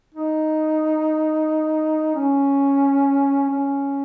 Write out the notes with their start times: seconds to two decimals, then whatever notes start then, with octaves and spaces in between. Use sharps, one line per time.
0.15 D#4
2.16 C#4
3.50 C#4